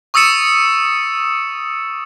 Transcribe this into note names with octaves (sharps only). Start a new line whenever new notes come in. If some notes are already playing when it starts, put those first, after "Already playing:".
C#6 D#6 E6 A6 C#7 E7